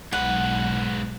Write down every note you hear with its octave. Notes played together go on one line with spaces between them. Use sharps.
B1 G#2 B4 F#5